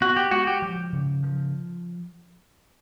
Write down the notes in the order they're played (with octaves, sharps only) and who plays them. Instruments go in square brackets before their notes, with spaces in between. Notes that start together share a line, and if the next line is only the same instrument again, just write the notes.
[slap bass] B3 [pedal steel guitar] F#4
[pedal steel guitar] G4
[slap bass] G#3 [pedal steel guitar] F#4
[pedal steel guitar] G4
[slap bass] F3
C#3
F3